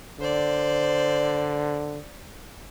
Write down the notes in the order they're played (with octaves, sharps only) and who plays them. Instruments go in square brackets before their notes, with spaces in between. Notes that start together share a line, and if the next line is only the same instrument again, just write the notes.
[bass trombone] D3 [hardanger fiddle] C5 D5